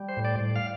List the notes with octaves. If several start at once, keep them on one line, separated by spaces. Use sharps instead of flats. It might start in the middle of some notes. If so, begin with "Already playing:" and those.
Already playing: G3
C5
A2
D5
A2
F5